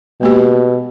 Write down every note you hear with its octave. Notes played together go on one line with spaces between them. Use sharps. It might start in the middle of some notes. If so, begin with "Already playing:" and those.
B2 G#3 A#3 G4